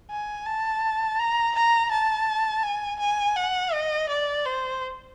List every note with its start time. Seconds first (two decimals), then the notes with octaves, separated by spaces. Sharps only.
0.11 G#5
0.46 A5
1.19 A#5
1.55 A#5
1.91 A5
2.63 G#5
2.99 G#5
3.36 F#5
3.72 D#5
4.09 D5
4.45 C5